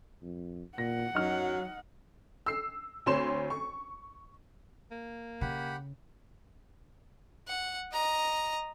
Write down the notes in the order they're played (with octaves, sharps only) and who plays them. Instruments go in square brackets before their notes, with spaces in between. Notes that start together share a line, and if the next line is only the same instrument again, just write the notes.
[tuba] F2
[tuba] A#2 [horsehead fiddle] F#5 [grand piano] A#6
[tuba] F#2 [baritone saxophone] F#3 [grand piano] D#4 F6
[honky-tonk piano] E6 C7
D2 C4 C#5 C6 E7
C#6
[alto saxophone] A#3
[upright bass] C#3 [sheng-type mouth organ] G4 F#5 B5
[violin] F#5
D#5 A#5